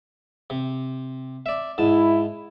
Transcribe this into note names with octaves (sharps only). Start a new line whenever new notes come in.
C3
D5 E5
G#2 E4 A5